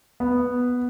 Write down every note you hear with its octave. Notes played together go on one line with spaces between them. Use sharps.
B3